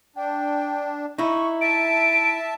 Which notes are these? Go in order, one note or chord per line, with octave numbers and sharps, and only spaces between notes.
D4 G5
D#4 E4 C#6
E5 A5 D7